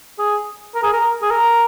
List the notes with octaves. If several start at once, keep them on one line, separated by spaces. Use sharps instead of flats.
G#4
A#4
G#4
A#4
G#4
A#4